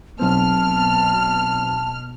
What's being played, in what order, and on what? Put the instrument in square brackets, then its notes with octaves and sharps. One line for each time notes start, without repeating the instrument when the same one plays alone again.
[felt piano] B1 C4 [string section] B2 F6 [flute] A5